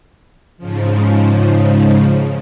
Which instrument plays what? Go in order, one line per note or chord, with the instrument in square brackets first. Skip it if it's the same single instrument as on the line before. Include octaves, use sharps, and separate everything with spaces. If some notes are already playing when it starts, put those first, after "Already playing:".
[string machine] G#2 C#3 F3